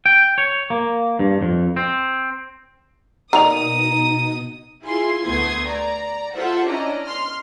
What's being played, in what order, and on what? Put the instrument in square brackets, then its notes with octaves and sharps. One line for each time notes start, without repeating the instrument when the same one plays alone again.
[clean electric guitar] G5
C#5
A#3
G2
F2
C4
[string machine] B2 D#4 [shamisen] D#3 A#3 D5 [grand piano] A#5 F7 [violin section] D#6
[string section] E4 F4 G#4 G#5 C6
D2 A3 B3 C6 D#6 G#6
D5 A#5
F4 A4 C5 E5 F#5
C#4 D4 E4 D5 D#5 A#5
C6 F6